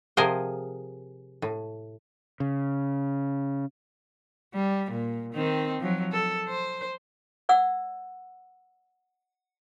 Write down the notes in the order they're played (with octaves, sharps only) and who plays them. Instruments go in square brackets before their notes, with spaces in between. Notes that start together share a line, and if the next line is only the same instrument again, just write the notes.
[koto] C3 F3 G#4 A#4 C5
A2
[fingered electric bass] C#3
[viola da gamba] G3
A#2
D#3 C4 D#4
F3 F#3
A4
C5
[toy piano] D5 F#5 E6